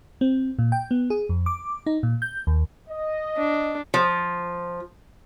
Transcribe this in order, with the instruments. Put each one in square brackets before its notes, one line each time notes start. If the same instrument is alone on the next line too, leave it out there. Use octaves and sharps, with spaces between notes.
[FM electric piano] C4
A#2
G5
B3
G#4
F2
D6
D#4
A#2
G6
D#2
[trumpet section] D#5
[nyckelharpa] D4
[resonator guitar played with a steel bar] F3